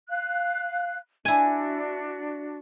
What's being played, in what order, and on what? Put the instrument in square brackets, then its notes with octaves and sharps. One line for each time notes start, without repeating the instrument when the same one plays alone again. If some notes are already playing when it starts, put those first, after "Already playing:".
[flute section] F5 F#6
[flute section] D4 F#4 [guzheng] E4 G#5